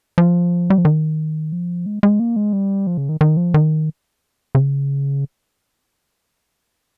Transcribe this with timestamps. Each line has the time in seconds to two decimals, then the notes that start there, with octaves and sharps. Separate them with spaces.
0.18 F3
0.70 G3
0.78 F3
0.85 D#3
1.52 F3
1.86 G#3
2.03 G#3
2.20 A#3
2.36 G#3
2.53 G3
2.87 F3
2.97 C#3
3.09 D#3
3.21 D#3
3.37 F3
3.54 D#3
4.55 C#3